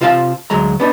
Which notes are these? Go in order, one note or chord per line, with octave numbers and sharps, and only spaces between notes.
C3 F4 C5 F5 G5 A5
D2 F#3 G#3 A#5
B3 D4 D#4